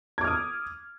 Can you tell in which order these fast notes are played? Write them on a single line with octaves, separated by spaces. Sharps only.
G#6 D6 F6 D#6